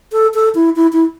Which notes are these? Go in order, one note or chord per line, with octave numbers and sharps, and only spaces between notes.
A4
A4
E4
E4
E4